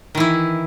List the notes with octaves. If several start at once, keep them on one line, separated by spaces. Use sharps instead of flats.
D#3 E3 E4